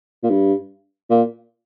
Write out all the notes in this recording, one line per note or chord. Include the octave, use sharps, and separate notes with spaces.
A#2
G2
A#2